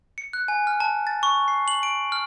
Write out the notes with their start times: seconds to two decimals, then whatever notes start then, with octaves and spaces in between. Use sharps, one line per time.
0.18 C#7
0.33 F#6
0.48 G#5
0.67 F6
0.80 A5
1.07 A6
1.23 C#6
1.48 C7
1.68 F#7
1.83 D7
2.12 F6